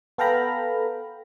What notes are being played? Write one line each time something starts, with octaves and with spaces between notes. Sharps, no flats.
B3 A4 F5 G5 A#5 B5